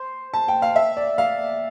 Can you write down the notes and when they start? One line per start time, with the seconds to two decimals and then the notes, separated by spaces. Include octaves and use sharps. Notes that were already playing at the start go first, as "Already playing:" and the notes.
Already playing: C5
0.34 A5
0.48 G5
0.62 F5
0.76 E5
0.97 D5
1.18 F5